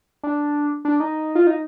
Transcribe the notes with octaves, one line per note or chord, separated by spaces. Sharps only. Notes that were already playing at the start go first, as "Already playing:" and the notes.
D4
D4
D#4
F4
D#4